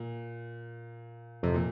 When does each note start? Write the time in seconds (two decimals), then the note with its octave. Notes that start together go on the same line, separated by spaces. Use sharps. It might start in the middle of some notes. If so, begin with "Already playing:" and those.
Already playing: A#2
1.43 F2 C3
1.54 A#2